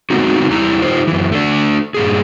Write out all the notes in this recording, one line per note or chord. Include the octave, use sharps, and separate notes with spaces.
G#3 A3 B3 C4 D#4 F#4
E2 G3 E4 A#5
D#4 F4 G4 C5
F#2 E3
A3 D4
G2 A#2 G#4